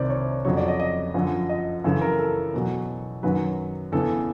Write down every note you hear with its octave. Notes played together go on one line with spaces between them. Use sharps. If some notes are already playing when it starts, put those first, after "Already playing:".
Already playing: C2 C3 D#3 C5 D5
C#5
F2 C#3 F#3 C#5
D5
D#5
D#5
F#2 D3 F3
D#5
F#2 C#3 E3 A4
A#4
A4
E2 B2 F#3
F#2 D#3 F#3 B4
E2 C#3 E3 A4